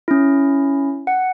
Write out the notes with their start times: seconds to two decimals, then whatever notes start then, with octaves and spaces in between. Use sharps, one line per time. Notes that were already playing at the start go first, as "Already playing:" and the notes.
0.08 C#4 E4
1.07 F#5